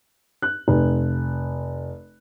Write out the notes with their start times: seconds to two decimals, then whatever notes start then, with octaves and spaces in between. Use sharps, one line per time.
0.42 F#6
0.68 F1